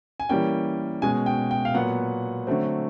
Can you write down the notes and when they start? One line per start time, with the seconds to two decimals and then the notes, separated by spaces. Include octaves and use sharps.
0.20 G#5
0.29 E3 G3 A#3 C#4 G5
1.02 B2 G#3 C#4 G#5
1.26 G5
1.51 G5
1.65 F5
1.74 A#2 F#3 B3 F#5
2.47 D3 F#3 A3 C4